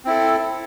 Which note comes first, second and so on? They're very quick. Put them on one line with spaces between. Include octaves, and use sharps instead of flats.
C4 E4 A4